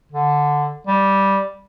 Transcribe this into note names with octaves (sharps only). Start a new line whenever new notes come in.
D3
G3